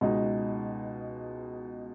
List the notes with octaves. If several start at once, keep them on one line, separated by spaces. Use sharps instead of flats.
C#2 B2 G#3 D#4